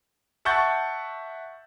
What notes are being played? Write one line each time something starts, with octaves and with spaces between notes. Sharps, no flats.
E5 F#5 A5 C#6 G6 A6